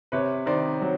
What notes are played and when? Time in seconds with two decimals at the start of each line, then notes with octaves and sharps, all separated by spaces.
0.12 C3 B4 C#5
0.46 D#3 C5 D5
0.81 F#3